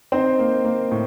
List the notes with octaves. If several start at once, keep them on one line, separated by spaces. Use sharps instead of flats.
C4 D#4 C5
A#3
A#3
A2